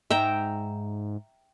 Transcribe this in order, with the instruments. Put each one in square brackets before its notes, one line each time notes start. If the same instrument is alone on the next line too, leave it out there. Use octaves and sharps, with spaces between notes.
[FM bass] G#2 [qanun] E5 G5 A#5